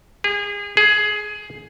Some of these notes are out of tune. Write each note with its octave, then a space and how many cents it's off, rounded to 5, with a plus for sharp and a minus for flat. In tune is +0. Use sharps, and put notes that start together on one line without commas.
G#4 -30
G#4 +15